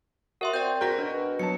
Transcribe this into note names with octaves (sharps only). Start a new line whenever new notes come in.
F#4 A#4 E5 C6
C4 D5 G6
F#4 G#4 A#4 F#5 G6 A#6
B2 D4
F#3 B3 A5 C#7